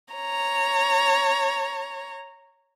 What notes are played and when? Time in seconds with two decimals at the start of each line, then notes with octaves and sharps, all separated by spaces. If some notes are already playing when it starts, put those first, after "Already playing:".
0.14 C#5 A#5